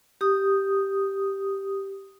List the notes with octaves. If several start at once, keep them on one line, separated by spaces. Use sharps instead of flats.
G4 D#6